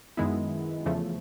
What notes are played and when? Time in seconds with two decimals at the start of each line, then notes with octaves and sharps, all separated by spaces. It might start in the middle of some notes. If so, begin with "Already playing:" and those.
0.17 F#2 D#3 G#3 B3 E4
0.86 E2 C#3 F3 A3